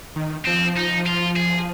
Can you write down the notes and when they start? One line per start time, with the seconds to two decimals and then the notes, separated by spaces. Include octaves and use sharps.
0.16 D#3
0.46 F3 C4
0.77 D#4
1.06 F4
1.36 G#4